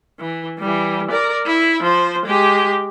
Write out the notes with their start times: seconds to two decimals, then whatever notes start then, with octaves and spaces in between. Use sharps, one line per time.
0.20 E3
0.59 E3 G3
1.11 A#4 D5
1.46 E4
1.83 F3 C5
2.26 G#3 G4